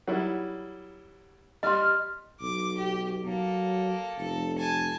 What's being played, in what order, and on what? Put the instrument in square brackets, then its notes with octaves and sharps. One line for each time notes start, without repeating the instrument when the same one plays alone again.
[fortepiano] F#3 G3 E4
[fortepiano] G3 [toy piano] D#5 C6 [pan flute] F6
[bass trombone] B1 [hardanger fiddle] D6
[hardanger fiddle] G4
[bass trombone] F#3 [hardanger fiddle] A#3 A4
[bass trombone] F1 [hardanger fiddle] A4
[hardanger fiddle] G#5 A5